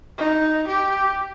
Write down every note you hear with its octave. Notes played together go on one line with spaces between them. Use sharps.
D#4
G4